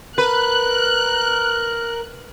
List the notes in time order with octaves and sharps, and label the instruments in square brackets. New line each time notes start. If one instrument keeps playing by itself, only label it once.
[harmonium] A#4 [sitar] B4 [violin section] F#6